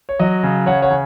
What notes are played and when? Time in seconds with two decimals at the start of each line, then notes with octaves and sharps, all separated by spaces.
0.09 C#5
0.19 F#3 D#5
0.43 C#3
0.66 C#3 C#5 F#5
0.82 C#5 F#5
0.90 C#3